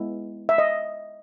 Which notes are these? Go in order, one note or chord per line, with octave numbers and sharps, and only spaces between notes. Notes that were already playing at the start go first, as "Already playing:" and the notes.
Already playing: G#3 B3 E4
E5
D#5